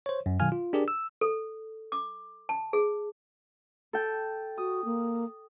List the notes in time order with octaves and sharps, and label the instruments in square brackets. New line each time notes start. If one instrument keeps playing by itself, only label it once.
[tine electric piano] C5 C#5
F#2
B2 D#3 F#3 F5 G#5 F6
F4
D4 G4 G#4 A#4 D5
E6
[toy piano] A4
D6
A5
G#4
[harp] A4 G5
[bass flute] F#4 [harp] D#6
[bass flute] A#3